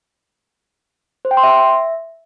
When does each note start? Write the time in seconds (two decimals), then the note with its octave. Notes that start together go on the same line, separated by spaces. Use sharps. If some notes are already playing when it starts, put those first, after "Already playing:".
1.25 C5
1.31 G5
1.37 C6
1.43 E5